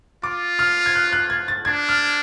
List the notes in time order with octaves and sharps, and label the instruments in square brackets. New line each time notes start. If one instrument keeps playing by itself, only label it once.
[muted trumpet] F4 [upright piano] D6
[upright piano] F6
G#6
F#6
F#6
G#6
A6
[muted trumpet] D4 [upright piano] G#6
[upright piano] F6